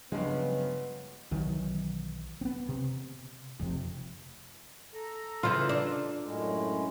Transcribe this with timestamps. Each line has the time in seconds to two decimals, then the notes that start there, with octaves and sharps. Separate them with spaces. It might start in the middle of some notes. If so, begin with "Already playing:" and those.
0.12 G2 C#3 F3 F#3 G#3 B3
1.31 B1 D#3 E3 F#3
2.41 B3 C4
2.69 C3
3.60 F1 F2 C3
4.94 A4 A#5
5.43 C#3 E3 F4 C5
5.69 D4
6.24 F#2 A2 G#3